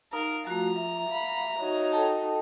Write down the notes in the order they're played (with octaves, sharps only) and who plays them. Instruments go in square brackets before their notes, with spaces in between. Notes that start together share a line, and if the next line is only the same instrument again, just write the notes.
[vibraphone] D#4 [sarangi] A#4 [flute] F5
[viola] F3 [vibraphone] A3 F#4 [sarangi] A#5
[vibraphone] E5
[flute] F5 [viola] B5
[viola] D#4 F#4 [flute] C#5
[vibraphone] A4 G5 A5